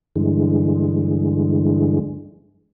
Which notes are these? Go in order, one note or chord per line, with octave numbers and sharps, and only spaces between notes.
G2 D3 E3 G#3